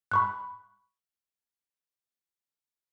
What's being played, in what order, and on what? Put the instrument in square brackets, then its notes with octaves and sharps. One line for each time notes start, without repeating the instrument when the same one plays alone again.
[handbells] B5 C#6 F#6